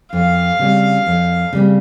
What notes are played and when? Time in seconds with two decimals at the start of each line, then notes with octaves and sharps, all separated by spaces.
0.13 F2 F5
0.59 C#3 G3 C4
1.06 F2
1.53 C#3 G3 C4